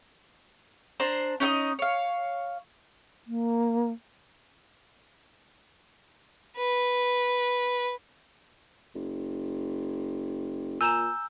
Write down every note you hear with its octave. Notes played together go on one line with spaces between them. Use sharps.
D4 C5 A#5
C#4 D#4 A4 D#5
C#5 F5
A#3
B4
F#1
A#2 G#5 A#5 E6 G6 E7